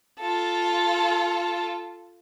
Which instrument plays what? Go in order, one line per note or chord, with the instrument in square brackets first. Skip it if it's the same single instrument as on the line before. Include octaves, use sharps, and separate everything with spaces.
[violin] F4 A4